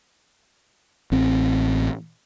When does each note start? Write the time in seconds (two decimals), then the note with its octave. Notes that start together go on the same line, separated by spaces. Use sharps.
1.12 A1 C4